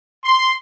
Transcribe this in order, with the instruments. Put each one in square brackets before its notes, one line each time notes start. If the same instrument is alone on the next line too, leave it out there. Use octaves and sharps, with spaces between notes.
[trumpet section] C6